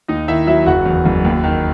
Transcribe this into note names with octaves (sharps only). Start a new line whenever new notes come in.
D#2 D#4 D#5
D#3 E4 E5
F#3 E4 E5
F#1 F#4 F#5
E2
F#1
D#2
D#3